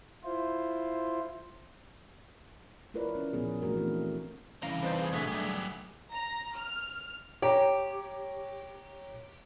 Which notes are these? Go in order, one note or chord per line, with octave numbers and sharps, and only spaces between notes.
E4 F4 C5
E4 F4 A#4 B4 C#5 D5
C#4
A#2 F3 B3 G#4
E3 A3 D4 F#4 A#4
C4 E4
C2 C#3 E3 G3 F5 A#5
C4 D#4 B4 A5 G6
G#4
B2 D3 A3 F#4 B6
G2 F#3 A3 G4
A#5
F6
G4 C#5 G5 A#5